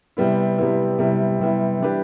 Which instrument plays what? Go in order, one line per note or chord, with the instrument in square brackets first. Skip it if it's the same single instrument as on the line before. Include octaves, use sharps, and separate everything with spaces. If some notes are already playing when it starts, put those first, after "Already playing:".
[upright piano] C3 G3 B3 E4
C3 G3 B3 E4
C3 G3 B3 E4
C3 G3 B3 E4
E3 G3 D4 G4 B4